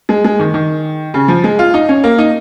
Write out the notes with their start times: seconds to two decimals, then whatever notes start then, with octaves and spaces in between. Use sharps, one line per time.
0.09 G#3
0.24 G#3
0.39 D#3
0.54 D#3
1.14 C#3
1.28 F3
1.44 G#3
1.59 F4
1.74 D#4
1.89 C#4
2.04 A#3
2.18 D#4